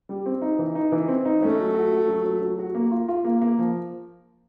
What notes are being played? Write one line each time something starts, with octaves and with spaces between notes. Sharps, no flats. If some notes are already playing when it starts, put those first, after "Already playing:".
G3
C4
D#4
E3
D#4
E3
C4
D#4
A3 C#4
F#3
F#4
F#4
F#3
F#3
F#3
F#4
A#3
F4
F4
A#3
A#3
F3